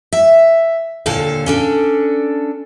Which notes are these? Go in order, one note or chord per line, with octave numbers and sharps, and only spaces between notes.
E5
D#2 A#2 D3 A4 F5
C#4 D4 A4